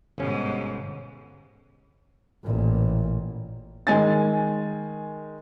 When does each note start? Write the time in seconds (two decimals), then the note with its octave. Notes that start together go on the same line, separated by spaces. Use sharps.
0.18 G1 G#2 B2 C#4
2.44 A1 A#2
3.87 D#3 G#3 G#5 A6